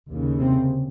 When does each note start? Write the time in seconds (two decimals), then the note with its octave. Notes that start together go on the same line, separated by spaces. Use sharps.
0.09 D#2 C#3
0.39 C3 C4